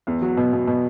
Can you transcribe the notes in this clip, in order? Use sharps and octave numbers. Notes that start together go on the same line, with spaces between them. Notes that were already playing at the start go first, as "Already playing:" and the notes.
E2
F#3
B2
B2
B2